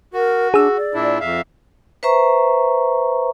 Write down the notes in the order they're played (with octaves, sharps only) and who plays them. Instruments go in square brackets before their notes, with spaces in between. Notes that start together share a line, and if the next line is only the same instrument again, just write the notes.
[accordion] F#4 [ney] A#4
[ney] D4 [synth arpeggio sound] G#4 E6
[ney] D5
[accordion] A#2 D4 E4
F2 E5 F5
[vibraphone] B4 C5 E5 A#5 C#6